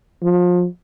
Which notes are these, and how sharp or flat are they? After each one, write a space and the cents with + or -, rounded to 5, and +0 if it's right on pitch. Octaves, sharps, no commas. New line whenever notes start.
F3 +30